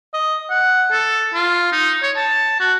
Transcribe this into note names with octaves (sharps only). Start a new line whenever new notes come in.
D#5
F#5
A4
F4
D#4
C#5
A5
F#4